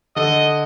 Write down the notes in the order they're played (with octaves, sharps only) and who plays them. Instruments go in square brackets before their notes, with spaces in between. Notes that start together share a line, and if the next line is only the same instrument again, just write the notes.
[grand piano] D3 [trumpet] D#5